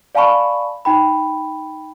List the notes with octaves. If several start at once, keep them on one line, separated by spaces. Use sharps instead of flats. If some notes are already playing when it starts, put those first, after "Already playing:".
D5 F5 G#5 A5 B5 C#6
D#4 G5 B5